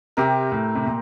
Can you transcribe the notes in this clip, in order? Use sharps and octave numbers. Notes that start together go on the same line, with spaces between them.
C3 C4 G4 A#4
A2
C3
A#2